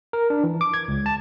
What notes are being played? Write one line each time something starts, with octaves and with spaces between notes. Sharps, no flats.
A#4
D4
E3
D6
G#6
C#2
A5